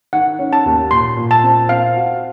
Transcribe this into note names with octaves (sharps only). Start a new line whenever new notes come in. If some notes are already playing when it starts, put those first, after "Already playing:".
D#3 F#5
C#4
A5
D#2
A#2 C6
A#2
A5
C4
C4 F5
F#4